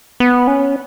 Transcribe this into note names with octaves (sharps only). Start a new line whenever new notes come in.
B3
C#4